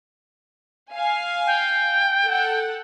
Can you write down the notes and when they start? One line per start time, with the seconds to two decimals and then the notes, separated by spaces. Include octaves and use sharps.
0.92 F5 G#5
1.46 G5
2.26 A4 F#5